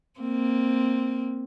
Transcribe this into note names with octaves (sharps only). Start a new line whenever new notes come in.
A#3 C4